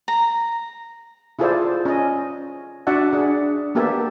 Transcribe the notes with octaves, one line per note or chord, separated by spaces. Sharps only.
A#5
E4 F4 G#4 A4 C5 D5
C#4 D#5
D4 F#4 D5 E5 F#5 A5
D4 G#4
A#3 B3 G4 A4 E5